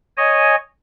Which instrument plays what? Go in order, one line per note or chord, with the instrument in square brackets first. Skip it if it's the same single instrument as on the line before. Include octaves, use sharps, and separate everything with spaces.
[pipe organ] C#5 D#5 G#5